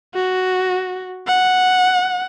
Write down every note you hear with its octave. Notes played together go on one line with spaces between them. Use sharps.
F#4
F#5